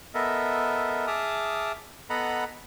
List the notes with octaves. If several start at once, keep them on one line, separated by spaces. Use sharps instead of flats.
B3 A4 A#4 D#5 E5
G#4 E5 A5 D6 D#6 F6
B3 A4 D#5 F#5 A#5 B5